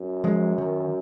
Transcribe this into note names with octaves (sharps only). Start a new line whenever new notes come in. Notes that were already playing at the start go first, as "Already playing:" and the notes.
Already playing: F#2
F3 G#3
D#3